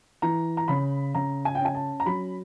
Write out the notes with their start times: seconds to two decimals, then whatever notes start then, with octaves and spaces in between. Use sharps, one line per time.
0.22 E3 A#5
0.57 A#5
0.68 C#3 B5
1.14 C#3 A#5
1.45 G#5
1.55 G5
1.60 C#4 G#5
1.75 A5
2.00 A#5
2.06 F#3 B5